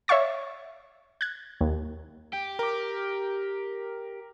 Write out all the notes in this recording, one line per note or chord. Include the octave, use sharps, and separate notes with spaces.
C#5 E5 F5 C#6 A6
F#6 G#6
D#2
G4
A#4 D6